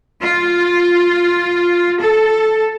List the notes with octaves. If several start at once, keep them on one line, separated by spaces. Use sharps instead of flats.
F4
A4